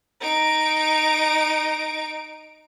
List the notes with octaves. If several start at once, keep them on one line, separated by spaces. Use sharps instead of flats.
D#4 D7